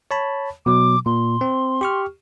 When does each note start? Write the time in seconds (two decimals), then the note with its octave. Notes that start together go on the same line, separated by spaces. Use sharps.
0.11 C#5 A5 B5
0.66 B2 F#3 D6
1.06 A#2 C6
1.41 C4
1.81 G4 C#6 F6